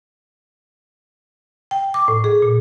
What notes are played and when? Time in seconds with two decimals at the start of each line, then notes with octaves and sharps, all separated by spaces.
1.71 G5
1.94 D6
2.08 A2
2.24 G#4
2.42 A#2